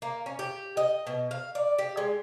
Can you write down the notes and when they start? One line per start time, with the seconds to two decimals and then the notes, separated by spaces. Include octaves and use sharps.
0.02 A#3
0.26 C#4
0.39 G4
0.77 D#5
1.07 B2
1.31 F5
1.55 D5
1.79 G4
1.97 G#3